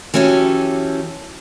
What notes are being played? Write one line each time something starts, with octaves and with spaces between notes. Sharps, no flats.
E3 F#3 C#4 G4 A4